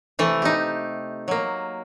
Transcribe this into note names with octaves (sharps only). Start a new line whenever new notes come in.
C3 E3 A3
D#4 G4
F#3 A#3